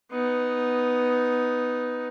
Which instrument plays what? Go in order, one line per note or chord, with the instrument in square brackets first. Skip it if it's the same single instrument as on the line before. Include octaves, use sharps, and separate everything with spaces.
[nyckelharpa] B3 D#4